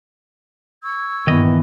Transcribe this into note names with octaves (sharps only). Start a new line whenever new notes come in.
C#6 E6 G#6
G2 A#2 D#3 E3 B3 D#5